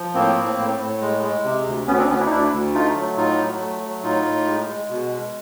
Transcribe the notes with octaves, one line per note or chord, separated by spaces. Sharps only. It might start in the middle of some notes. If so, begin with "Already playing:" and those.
Already playing: F3
A2 A#3 C4
A2
A2
A2
G#3
G#3
C3
D2
D2 B3 C#4
C4 D4
D2 B3 C#4
D4 E4
D#4
D2 D4 E4
D2
A3 D#4 F4
F#3
A2 D#4 F4
F#3
A3
F#3
A2 D#4 F4
A2
G#3
G#3
B2
G#3